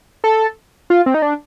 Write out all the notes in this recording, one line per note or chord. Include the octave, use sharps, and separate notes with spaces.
A4
F4
C4
D#4
D4